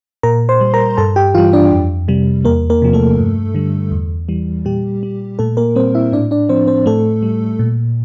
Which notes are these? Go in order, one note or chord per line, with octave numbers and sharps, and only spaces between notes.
A#2 A#4 A#5
C5 C6
G3
A#4 A#5
G2 A4 A5
G4 G5
E3 G3 F4 F5
D4 D5
F2
C3 G3
E2 A#3 A#4
A#3 A#4
C3 F3
A3 A4
G2
D3 G3
E2
E3 G3
A#2 G3 G4
G3
A#2 A3 A4
A#3 A#4
G3 C4 C5
E4 E5
A2 D4 D5
D4 D5
F3 C4 C5
C4 C5
A2 A3 A4
G3
A#2